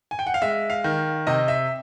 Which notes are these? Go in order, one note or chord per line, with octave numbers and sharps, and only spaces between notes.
G#5
G5
F#5
F5
G#3 E5
F5
D#3
C3 D#5
E5